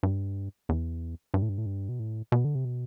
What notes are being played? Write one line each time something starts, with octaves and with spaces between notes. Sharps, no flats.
G2
E2
G2
A2
G2
A2
G2
B2
A2
B2
D3
C3
B2